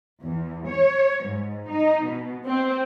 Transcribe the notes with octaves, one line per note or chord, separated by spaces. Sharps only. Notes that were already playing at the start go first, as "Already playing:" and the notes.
E2
C#5
G#2
D#4
B2
C4